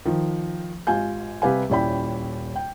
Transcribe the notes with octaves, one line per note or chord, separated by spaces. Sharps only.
D#3 F3
G#1 F4 G4 G#5 G6
C3 G3 G4 B4 F5 G#5
D#1 C#4 E4 D5 G5 B5
G5